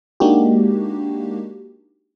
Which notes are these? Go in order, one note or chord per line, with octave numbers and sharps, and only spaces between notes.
G#3 A#3 D4 D#4 F#4 G4